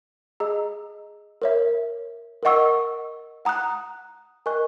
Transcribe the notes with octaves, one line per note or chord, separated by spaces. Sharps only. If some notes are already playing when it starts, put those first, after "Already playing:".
G#4 D#5 A#5 E6
A#4 C#5 E5
A#4 D#5 F#5 C#6 E6
F#5 A#5 D#6 F#6
A#4 D#5 G#5 C#6 F#6